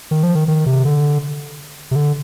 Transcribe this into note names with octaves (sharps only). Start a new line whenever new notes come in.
D#3
F3
D#3
D#3
C3
D3
C3
D3